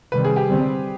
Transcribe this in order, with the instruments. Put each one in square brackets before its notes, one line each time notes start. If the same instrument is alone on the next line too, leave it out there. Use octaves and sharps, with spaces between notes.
[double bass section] C3 D#3 G3 C4 [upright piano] B4
[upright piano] G#4
G4
[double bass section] D3 G3 C4